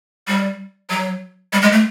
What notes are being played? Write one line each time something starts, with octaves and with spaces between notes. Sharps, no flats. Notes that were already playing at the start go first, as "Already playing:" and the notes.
G3
F#3
G3
G#3
A3